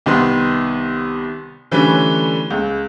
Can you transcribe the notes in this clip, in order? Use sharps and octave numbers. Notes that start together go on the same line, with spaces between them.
C2 D#3 B3 C6
D3 E3 G3 A3 C#4 B4
C#2